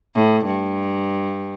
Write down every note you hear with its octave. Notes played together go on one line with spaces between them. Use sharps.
A2
G2